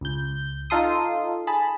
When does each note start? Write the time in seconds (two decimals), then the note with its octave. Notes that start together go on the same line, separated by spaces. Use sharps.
0.01 C#2 G6
0.70 D#4 F4 A4 C6 D#6
1.47 G#4 A5 B5